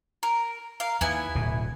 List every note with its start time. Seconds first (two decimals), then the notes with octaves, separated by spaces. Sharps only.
0.23 A#4
0.80 A#4 F5
1.01 D#2 B3 E4 G#5
1.35 D1 B2